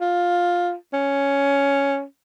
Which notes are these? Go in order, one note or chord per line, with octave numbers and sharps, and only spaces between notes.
F4
C#4